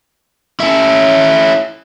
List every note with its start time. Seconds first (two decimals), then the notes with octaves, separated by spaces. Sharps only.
0.60 C#4 E4